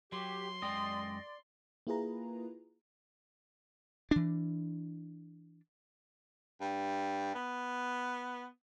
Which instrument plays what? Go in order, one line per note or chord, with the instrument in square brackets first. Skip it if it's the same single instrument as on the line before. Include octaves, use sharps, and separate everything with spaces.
[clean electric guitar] F#3 [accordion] G4 [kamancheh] C6
[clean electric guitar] F#2 G#3 G5 [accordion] D5 [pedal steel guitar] D#5
[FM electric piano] A#3 E4 F4 G#4 B4 A#5
[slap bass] E3 D4
[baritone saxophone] G2
B3